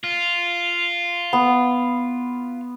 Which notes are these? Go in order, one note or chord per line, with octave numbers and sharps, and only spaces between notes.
F4
B3